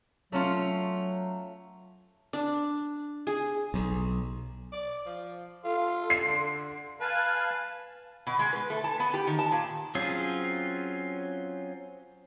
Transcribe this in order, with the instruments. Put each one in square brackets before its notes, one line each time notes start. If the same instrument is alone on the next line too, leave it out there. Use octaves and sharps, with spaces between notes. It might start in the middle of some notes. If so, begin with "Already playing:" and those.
[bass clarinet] F#3 [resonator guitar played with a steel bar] A3 C#4 F4
[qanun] D4
G#4
[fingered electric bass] B1
[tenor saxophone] D5
F3
[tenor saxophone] F4 [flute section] A4 C6
[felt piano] C7
[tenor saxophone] D3
[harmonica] B4 [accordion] F5 G#5 A5
[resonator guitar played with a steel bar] B2
G#3
B4
A3
A5
B3
G4
D#3
A5
A#2
[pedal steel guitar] F#3 C4 C#4 F4 G#4